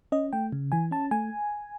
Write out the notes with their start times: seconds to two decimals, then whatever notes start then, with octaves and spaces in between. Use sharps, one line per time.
0.12 C#4 D#5
0.33 A3 G5
0.52 C#3
0.72 E3 G#5
0.91 C#4 A5
1.11 A3 G#5